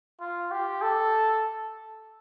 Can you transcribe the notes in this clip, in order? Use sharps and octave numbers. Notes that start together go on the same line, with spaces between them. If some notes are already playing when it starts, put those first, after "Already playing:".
F4
G4
A4